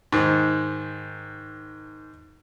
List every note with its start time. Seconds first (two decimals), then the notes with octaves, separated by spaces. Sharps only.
0.12 G#2 D#3